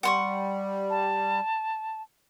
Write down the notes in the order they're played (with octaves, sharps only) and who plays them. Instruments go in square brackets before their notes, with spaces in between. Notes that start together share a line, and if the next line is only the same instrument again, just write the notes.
[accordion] G3 [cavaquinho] F#5 C6 C#6
[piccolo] A5